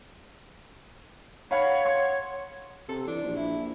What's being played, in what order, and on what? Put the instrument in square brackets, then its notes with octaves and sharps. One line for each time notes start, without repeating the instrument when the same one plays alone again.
[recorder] C#5 [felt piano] F5 F#5 B5
[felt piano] F#5 C6
[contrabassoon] C3 [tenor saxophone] A4
[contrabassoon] E3 [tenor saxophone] D4
[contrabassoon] A#1
[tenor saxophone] E4